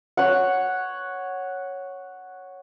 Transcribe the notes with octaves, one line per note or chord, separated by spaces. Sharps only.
C#5 F#5